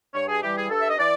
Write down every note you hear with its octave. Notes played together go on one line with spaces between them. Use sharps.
G2 C#5
G#4
E3 G3 G4
G#4
G2 A4
E5
D#5
E3 D5